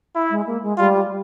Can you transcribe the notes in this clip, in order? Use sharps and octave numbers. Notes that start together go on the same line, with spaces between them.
E4
G#3
A#3
G#3
G3 F4